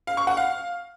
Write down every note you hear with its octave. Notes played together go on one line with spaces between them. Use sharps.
F5
C#6
F#5
F5